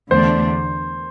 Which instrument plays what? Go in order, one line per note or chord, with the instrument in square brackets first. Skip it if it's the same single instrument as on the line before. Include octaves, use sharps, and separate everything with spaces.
[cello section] E2 D3 A3 D4 [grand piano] C5